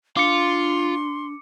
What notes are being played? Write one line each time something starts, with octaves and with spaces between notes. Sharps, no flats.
D4 F4 C6 D6 C#7